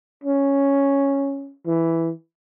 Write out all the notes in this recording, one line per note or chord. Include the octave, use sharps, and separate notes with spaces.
C#4
E3